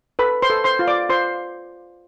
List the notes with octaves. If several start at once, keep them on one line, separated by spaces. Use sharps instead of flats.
A4 B4 B5
C5 C6
A4
C5 C6
F4
D5 D6
F4 C5 C6